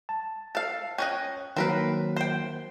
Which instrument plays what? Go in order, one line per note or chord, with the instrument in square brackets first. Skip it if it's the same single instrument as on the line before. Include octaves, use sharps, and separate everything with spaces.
[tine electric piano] A5
[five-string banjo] A4 F5
[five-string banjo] C#4 C#5 D#5 [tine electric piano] G5 F#6
[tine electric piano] D#3 F#3 A#3 [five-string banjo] C4 A#4 B4
[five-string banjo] C5 G5